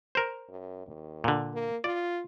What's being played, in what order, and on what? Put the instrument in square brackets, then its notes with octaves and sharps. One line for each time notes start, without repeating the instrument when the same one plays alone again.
[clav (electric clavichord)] A#4 C5
[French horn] F#2
D#2
[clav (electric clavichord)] A#2 D3
[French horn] A#3
[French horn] F4 [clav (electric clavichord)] D5